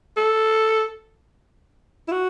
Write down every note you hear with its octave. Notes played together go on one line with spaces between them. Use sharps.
A4
E4
F#4